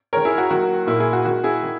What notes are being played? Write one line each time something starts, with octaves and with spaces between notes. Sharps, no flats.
D#3 G#3 A#4 C#5
E4 G#4
F#4
D#3 F#3 A#3 F#4
A#2 A#3 E4
E4 G#4
F#4
D#3 G#3 F#4
E4 G#4
D#3